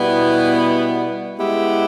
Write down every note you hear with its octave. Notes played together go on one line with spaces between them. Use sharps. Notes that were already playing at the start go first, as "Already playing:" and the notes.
Already playing: B2 G3 B3 E4
G#3 B3 E4 G4